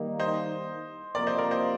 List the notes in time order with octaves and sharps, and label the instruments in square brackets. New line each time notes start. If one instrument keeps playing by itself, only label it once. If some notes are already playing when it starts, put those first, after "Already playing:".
Already playing: [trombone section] D#3 G3 A#3 D#4
[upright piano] C5 D#5
[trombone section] C3 F3 A#3 [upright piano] A#4 D5
[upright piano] C5 D#5
A#4 D5
C5 D#5